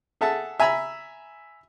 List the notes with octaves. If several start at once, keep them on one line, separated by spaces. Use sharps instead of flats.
G#4 A4 E5 F#5 A5
E5 G#5 A#5 B5 E6